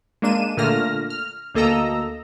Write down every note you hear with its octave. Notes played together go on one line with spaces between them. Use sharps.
G#3 A#3 D4 D#7 E7
A#2 D3 A3 A#3 F6 A#6
F6
D2 A#3 A4 D#5 A#5 E6